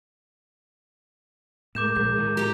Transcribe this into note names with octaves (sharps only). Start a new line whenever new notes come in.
A2 G#3 A#4 D6 G6 E7
A#1 G6
A2 D#3
G4 A#5